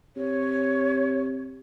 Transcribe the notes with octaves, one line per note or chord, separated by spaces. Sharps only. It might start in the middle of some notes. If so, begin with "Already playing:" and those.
C3 C#5